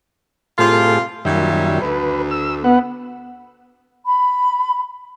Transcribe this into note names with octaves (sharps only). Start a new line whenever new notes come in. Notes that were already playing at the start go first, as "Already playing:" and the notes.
A2 C3 G3 F4 G#4 A4
F#2 A#2 D#3 F#3 G3 E5
D2 B4
E6
B3 B4 F#5
B5